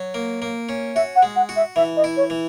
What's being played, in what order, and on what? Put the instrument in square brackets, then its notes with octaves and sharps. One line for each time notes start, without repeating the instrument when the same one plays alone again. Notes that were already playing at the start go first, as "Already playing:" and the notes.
Already playing: [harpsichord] F#3
A#3
A#3
C#4
[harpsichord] F#4 [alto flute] E5
[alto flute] F#5
[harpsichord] G#3
[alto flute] F#5
[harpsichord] F#4
[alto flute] E5
[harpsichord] E3 [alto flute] E5
[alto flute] D#5
[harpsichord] E4
[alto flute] C#5
[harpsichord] E3